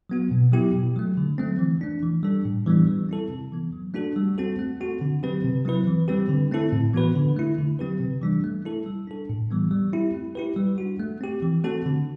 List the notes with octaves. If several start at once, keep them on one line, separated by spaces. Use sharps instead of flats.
F#3 B3 F#4
B2
F#3 B3 E4 G4
B2
F#3 A3
D3
F#3 A3 C4
E3
A3 D4
E3
G3 D4 A4
A2
E3 G3 B3 D4
G3
C4 E4 A4
C3
E3 B3
F#3
A3 D4 F#4 A4
G3
C4 F#4 A4
A3
C4 F#4 A4
D3
F#3 C4 G4 B4
C3
F#3 C4 E4 B4
E3
G3 C4 G4 B4
D3
A3 C4 E4 A4
A2
E3 B3 F#4 B4
D3
A3 E4
D3
F#3 C4 G4 B4
C3
E3 G3 D4
A3
E4 A4
G3
D4 A4
A2
E3 G3 B3
G3
C4 E4 G4
A3
E4 G4 B4
G3
D4 F#4
A3
C4 G4
E3
A3 C4 F#4 A4
D3